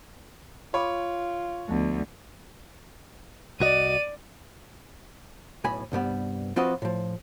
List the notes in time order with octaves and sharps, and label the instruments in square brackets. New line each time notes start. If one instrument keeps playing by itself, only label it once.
[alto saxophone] F4 [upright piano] C#5 [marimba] B5 D6
[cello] D2 [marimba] F3 B3
[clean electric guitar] C2 F#4 D#5 [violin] D5 D#7
[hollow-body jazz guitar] B1 A2 G#5 B5
C2 G2 G3 B3
F3 C4 F4 F#4 B4 D#5
A2 F3